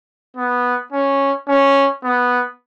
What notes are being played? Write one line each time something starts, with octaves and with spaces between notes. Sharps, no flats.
B3
C#4
C#4
B3